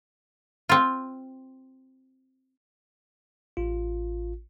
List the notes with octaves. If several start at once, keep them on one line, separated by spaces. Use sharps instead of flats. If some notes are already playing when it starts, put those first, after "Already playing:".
C4 F4
A1 F4